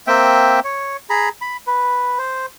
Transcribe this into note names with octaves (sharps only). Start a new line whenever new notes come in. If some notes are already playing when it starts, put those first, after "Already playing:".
A#3 C4 E5 G5
C#5
G#4 A#5 B5
B5
B4
C5